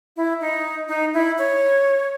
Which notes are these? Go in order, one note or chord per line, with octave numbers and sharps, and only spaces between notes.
E4
D#4
D#4
E4
C#5